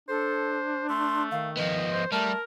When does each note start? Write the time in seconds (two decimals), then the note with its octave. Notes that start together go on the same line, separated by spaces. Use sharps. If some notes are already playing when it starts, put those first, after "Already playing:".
0.09 D4 A4 C5
0.89 A3 C6
1.32 D#3 F5
1.57 F3 B3 D#5
1.93 C5
2.12 G3 A3 A#4 A5